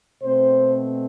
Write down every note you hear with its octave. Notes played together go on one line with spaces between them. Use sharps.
B2 A3 C4 C5